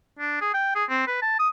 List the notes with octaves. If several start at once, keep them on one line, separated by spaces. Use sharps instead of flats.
D4
G#4
G5
G#4
C4
B4
A5
D#6